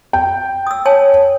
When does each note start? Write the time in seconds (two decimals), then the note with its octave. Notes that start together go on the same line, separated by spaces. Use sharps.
0.13 G5
0.67 D#6 E6
0.86 C#5 G#5 A5